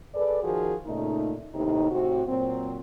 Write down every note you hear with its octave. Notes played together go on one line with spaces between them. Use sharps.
G#4 A4 B4 D5
D#3 F3 F#4 G#4 A#4
A#2 C#3 A3 D#4
D#2 A2 C3 D#4
A2 C3 C4 F#4
A#2 F#3 C4